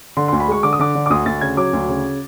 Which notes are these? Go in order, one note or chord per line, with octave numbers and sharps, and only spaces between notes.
D3 C6
D2 C6
B5
G#3 C#6
D3 D6
D#6
D3 D6
D3
D6
D2 D#6
D2 A6
C#3 G#6
F#3 D6
D2
C#3